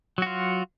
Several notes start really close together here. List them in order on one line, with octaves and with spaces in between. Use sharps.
F#3 F#4 F4